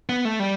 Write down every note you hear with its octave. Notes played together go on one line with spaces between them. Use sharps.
B3
A3
G3